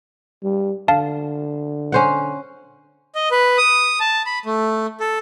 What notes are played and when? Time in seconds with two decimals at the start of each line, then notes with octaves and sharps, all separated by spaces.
0.43 G3
0.88 D3 F5 A5
1.92 C#4 C5 F#5
3.15 D#5
3.31 B4
3.58 D#6
4.00 A5
4.26 B5
4.46 A3
5.00 A4